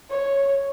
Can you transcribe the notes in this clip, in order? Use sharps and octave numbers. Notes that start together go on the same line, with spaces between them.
C#5